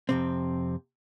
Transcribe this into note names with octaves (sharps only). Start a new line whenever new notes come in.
F2 C3 C4